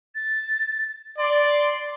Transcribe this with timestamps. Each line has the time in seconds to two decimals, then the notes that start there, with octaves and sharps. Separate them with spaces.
0.15 A6
1.18 D5 C6